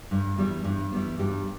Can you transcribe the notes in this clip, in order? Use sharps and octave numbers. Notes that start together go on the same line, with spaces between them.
G2
E3 G3 B3
G2
E3 G3 B3
G2 G4